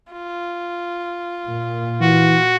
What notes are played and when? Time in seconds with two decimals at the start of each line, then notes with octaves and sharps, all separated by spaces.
0.12 F4
1.48 A#2
2.01 E3 F#4